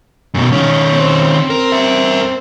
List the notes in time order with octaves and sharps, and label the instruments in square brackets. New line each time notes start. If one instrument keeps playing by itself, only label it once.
[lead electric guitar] F#2 B2
D#3 C#4
[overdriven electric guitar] C4 C5
[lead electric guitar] A#4
A#4 E5